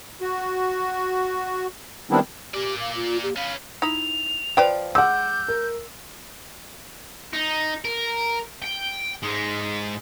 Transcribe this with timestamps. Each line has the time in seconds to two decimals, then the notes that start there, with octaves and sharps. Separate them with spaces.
0.21 F#4
2.11 D#3 G3 B3 C4 D4 E4
2.54 A#3 G4 D5
2.80 F5
2.96 F4
3.23 G4
3.36 C#4 B4 F5
3.82 D#4 E4 F7
4.57 F3 B4 D5 G5
4.95 G#3 F#5 D6 E6 G6
5.48 A#4
7.33 D#4
7.85 A#4
8.62 G5
9.23 G#2 G#3